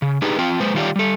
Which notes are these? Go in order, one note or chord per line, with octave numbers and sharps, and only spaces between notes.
C#3
D4 D#4 G4 G#4 B4
C4 F4 G5
G#3 B4 C5
D#3 G3 F4 G4 C#5 D5
G3 A4